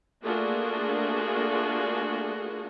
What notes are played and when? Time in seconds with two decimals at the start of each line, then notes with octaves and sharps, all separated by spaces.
0.23 A3 A#3 D4 F4 F#4 G#4